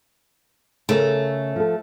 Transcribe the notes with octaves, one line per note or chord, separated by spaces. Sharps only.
C#3 A3 A4 A#4
F3 A4